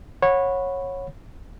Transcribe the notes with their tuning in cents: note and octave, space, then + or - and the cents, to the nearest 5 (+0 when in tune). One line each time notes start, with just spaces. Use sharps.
C#5 -15 F#5 -20 B5 +0